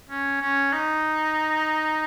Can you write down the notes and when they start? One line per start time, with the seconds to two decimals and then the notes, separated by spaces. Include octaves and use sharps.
0.09 C#4
0.41 C#4
0.72 D#4